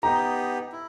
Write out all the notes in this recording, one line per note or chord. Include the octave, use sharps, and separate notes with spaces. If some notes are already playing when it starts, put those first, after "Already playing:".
B3 D#4 G4 A#5
E4